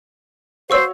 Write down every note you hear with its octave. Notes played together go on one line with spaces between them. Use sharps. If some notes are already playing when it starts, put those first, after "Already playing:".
F#4 C5 C#5 F5 C#6 E6